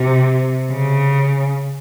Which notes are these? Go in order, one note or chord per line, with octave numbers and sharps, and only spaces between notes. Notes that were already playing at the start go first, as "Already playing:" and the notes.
Already playing: C3
C#3